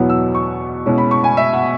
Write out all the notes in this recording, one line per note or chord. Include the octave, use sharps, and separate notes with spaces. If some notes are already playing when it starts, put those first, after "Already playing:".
Already playing: E2 B2 F#3 B3 E4
E6
C#6
B2 G#3 C#4 E4
B5
C#6
G#5
E5
F#5